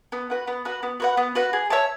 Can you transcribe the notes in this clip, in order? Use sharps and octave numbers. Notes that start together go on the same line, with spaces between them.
B3
F#4 B4 F#5
B3
F#4 B4 F#5
B3
F#4 B4 F#5
B3
F#4 B4 F#5
G#4
C#5 E5 A5